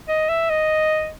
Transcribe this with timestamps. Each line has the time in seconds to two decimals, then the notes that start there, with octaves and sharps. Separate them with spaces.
0.08 D#5
0.29 E5
0.50 D#5